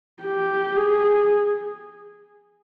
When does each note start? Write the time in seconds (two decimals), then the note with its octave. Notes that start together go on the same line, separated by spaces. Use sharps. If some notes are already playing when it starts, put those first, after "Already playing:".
0.22 G4
0.76 G#4